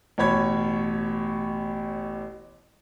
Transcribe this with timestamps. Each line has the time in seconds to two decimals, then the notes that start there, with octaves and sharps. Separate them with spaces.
0.18 A1 B2 C#5 B5 G#6